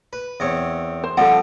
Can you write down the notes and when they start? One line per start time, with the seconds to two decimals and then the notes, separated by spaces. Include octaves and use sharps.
0.13 B4
0.40 E2 C4 C#5
1.04 C5
1.17 F3 G3 C4 A4 F#5